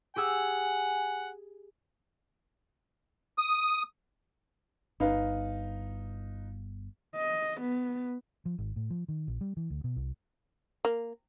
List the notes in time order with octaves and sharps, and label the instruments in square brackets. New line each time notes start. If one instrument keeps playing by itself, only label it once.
[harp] G4 G#4 E6 [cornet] F#5 [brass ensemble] G#5
[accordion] D#6
[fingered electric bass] G1 [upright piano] D#4 B4 F5
[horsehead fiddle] D#5
B3
[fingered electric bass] F3
G#1
A2
F3
D#3
A#1
G3
E3
D2
B2
C2
[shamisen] A#3